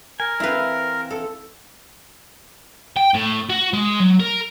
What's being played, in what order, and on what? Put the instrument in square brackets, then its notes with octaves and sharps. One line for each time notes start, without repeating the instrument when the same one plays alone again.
[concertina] A#4 [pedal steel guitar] G#5
[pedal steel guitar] E3 C4 F5 [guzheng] E4 B4
[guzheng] A4
[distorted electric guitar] G5
A2
F#4
G#3
F#3
A#4